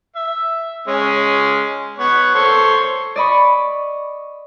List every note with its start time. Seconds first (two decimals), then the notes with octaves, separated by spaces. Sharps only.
0.16 E5
0.87 G#3 C#4
1.98 B3 C#5
2.35 A4 C5 C#5
3.16 D5 D#5 B5 C#6